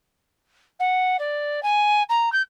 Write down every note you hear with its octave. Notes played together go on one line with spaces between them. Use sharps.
F#5
D5
G#5
A#5
G6